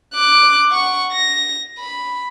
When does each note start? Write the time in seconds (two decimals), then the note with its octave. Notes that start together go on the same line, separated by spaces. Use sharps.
0.14 D6 F#6
0.71 F#5 C#6
1.12 A#6
1.79 B5